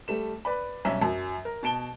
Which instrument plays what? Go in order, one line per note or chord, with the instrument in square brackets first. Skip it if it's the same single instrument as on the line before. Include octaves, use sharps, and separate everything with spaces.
[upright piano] G3 A3 E7
B4 D5 B5
B1 G2 C#4 E5 A#5
F#2 F#3
A#4
B2 A5 D7 G7